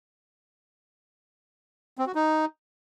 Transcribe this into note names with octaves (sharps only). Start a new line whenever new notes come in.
C4
F#4
D#4